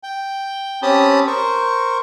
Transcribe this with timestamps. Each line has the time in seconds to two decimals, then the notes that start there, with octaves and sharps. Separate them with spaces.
0.03 G5
0.82 C4 C#4 G4 A5 B5 D#6
1.27 A#4 C5 C#6